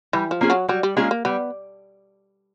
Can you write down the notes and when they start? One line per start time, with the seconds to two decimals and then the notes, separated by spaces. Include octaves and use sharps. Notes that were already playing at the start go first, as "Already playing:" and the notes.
0.13 E3 G3
0.31 F3
0.41 A#3 C#4 F4 G#4
0.50 F#3
0.68 F#3 G3
0.83 G3
0.97 G#3 A#3 C#4 F4 G#4
1.11 A#3
1.25 G3 B3